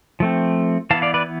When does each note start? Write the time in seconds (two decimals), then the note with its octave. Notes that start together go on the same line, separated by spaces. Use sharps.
0.20 F3 A3 C4
0.91 E3 B3 F5 A5
1.02 D5 F5
1.14 B4 D5